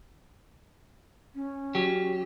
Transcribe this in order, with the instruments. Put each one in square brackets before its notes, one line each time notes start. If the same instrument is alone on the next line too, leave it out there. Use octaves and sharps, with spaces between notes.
[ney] C#4
[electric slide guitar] F#3 G4